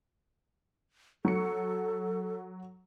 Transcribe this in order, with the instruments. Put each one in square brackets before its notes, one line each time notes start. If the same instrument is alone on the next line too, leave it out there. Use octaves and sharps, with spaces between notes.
[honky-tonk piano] F#3 C#6 C#7 [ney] A4